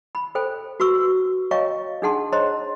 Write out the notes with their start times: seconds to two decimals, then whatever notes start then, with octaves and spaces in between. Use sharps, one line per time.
0.15 B5
0.35 A4 C5 G5
0.80 F#4 B4 A#5 C#6 E6
1.51 C#5 D#5 F5 G5 A#5 C#6
2.02 D4 D#4 G#4 F#5 A5 C6
2.32 C5 C#5 D#5 A#5 C6